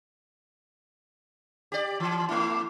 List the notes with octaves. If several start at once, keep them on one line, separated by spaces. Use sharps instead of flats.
G4 D5
E3
A3 E4